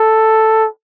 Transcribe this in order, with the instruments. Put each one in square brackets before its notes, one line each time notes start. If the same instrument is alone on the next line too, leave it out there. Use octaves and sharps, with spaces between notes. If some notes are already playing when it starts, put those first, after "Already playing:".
Already playing: [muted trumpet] A4